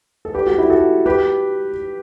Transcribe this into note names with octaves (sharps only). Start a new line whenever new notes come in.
A4
G4 B4
F#4 A4
E4 G4
F#4 A4
G4 B4